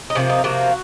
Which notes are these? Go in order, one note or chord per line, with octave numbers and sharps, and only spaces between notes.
D#4
C3 F3 A#3 C#4
D#4
C3 F3 A#3 F#4